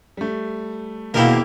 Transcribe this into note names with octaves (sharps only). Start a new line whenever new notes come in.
G3 A3
E1 D#2 B2 A#3 E4 G4 A#4 G7